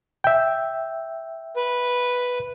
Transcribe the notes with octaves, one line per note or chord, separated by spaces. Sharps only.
E5 G5
B4